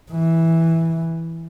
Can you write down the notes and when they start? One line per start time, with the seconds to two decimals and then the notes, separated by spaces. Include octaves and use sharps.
0.11 E3